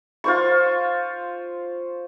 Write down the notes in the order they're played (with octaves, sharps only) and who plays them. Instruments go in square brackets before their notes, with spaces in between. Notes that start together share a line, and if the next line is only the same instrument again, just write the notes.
[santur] F4 C5 C#6